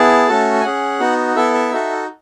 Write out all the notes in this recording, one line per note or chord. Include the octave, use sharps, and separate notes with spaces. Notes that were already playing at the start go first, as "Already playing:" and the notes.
Already playing: B3 E4 G#4 A5
A3 C#4 F#4 A4
G#5
C#4 G#4 F#5
B3 D#4 F#4
B3 E4 A4 E5
E5
D#4 F#4 A4